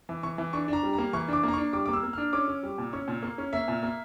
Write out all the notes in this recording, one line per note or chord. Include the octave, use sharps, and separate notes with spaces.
E3
E3 C#6
E3
D4 C#6
D4 A#5
G3
A#3 A#5
E3 C#6
D4 D6
A#3 A#5
D4 C#6
G3 D6
A#3 D6
E6
A#3
D4 F6
C#4 D6
C#4
G3
A#2
C#4 C#6
A#2
A#3
C#4
A#3 E5
A#2
A#3